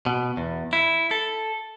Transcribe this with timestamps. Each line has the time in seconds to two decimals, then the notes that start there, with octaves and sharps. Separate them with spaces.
0.06 B2
0.37 E2
0.73 E4
1.11 A4